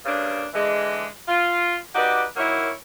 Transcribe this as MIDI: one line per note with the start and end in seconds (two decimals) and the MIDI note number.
0.06 0.46 43
0.06 0.46 49
0.06 0.46 58
0.06 0.46 62
0.54 1.07 50
0.54 1.07 52
0.54 1.07 56
1.28 1.76 65
1.95 2.23 63
1.95 2.23 66
1.95 2.23 67
1.95 2.23 71
1.95 2.23 74
2.37 2.70 51
2.37 2.70 54
2.37 2.70 58
2.37 2.70 64
2.37 2.70 73